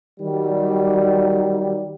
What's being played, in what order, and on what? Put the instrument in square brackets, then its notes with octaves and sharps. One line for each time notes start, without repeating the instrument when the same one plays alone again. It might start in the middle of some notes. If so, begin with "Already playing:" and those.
[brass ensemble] D#3 F#3 G3